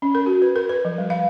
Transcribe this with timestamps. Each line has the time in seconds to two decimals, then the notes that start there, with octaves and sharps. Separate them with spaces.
0.02 C#4
0.15 A#4
0.26 F#4
0.42 B4
0.56 A#4
0.69 B4
0.85 F3
0.98 G3
1.10 F5